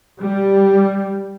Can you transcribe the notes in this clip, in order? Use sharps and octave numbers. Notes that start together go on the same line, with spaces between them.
G3